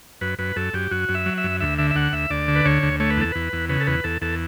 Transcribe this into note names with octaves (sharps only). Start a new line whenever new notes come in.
F#2 B4
F#2 B4
F#2 A4
F#2 G4
F#2 F#4
F#2
E5
F#3
E5
F#2
D2 E5
D3 E5
E5
D2 F#5
D2 E5
D2 D5
D3
B4
D2 C#5
D2
A3 C#5
B4
E2 A4
E2 B4
E2
C#3 B4
A4
E2 B4
E2 A4
E2 A4